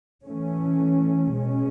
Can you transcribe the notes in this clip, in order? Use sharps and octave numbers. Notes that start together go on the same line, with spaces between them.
E3 A3 C#4
B2 G#3 C#4